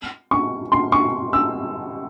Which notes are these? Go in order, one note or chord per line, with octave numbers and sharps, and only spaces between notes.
C#6
C6
C#6
E6